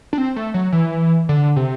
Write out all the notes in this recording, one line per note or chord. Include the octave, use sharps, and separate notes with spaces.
D4
C4
A3
F#3
E3
D3
C3